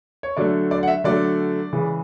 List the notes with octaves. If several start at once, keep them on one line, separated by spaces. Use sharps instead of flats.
C#5
D3 F#3 A3 D5
D5
F#5
E5
D3 F#3 A3 D5
C#3 E3 G#3